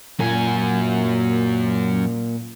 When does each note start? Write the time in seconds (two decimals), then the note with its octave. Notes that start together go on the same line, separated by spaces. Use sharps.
0.19 F#2 A#2 G#5